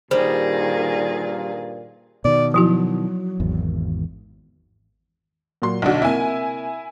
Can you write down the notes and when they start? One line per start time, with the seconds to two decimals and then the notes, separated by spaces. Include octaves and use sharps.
0.11 G2 A#2 D#3 G3 G#4 C5 A6
2.25 B2 D#3 D5
2.54 F3 F#3 E4 F#4
3.40 G#1 E2
5.62 A#2 F#3 C6
5.82 B1 D3 D4 D#4 F#4
6.02 C3 A#3 E4 G#5